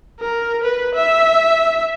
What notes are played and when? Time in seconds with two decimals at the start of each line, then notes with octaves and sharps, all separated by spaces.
0.20 A#4
0.63 B4
0.94 E5